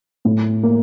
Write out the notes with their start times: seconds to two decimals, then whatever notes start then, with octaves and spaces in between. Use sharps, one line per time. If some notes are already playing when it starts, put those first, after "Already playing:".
0.25 A2
0.63 A#3